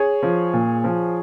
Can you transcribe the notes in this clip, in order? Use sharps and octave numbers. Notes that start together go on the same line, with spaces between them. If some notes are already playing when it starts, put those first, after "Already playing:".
Already playing: G#4 C#5
F3
A#2
F3